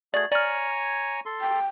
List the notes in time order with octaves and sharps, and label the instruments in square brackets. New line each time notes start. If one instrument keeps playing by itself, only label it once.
[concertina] A3 F#4 G#4 [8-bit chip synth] D5 G#6
[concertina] C#5 G#5 A#5 [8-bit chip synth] D5 F6
[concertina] A4 C6
[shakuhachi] G5